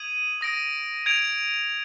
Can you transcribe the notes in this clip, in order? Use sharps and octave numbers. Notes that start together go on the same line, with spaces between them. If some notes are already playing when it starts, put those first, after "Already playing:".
Already playing: D#6 G#6 D#7 F#7
D#6 A#6 D7
G#6 D7 F7